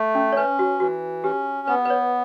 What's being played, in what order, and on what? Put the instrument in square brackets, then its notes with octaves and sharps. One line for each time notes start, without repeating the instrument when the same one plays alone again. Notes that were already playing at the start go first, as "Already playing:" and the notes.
Already playing: [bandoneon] A3
[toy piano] C#4
C#5
[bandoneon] C#4 [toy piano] B4
[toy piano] F#4
[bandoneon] E3 [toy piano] F#4
[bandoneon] C#4 [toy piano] G4
[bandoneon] B3 [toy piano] B4
[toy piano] B4
C#5